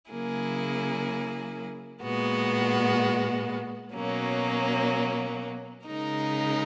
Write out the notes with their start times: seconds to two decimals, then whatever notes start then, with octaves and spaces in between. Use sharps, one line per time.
0.11 C#3 F#3 A#3 E4 G#4
2.02 A#2 G#3 B3 F#4
3.94 B2 F#3 A#3 C#4
5.86 C#3 G#3 D#4 A#4